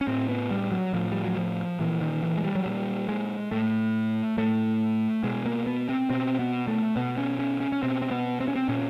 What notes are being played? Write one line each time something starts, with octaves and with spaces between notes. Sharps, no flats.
C#4
A2 C4
B3
G3
F#3
A2 F3
G3
F#3
F3
A#2 E3
D#3
E3
G#3
G3
F#3
A#2 G3
G#3
A2 A3
A2 A3
B2 G#3
A#3
B3
C4
B2 C4
B3
A3
B2 B3
C#4
C#4
C#4
C#4
B2 C4
C4
B3
C4
C#4
C4
A#2 C#4